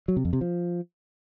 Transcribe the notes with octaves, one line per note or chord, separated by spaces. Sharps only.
F#3
C3
F2
C3
F3